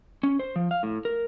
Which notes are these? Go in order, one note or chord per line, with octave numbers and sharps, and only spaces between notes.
C#4
C5
F3
F5
A2
A#4